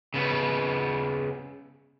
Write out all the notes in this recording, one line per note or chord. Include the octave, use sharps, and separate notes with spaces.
C#3 B3